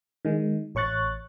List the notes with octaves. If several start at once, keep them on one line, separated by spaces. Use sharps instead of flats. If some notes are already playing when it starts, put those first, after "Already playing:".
D#3 G#3
A1 C#5 C#6 F#6 A6